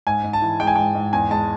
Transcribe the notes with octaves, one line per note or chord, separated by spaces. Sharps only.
G#2 G#5
G#2
A5
E3
G#3 G5
G#5
G#2 G5
G#2
E2 G#5
G#3 A5